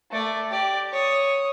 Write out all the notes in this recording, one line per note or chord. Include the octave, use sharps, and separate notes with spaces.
A3 D5
G4 D5
C#5 D#6